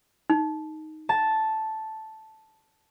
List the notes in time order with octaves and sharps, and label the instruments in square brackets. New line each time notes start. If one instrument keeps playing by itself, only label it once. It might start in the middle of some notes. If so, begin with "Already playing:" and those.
[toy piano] D#4
[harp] A5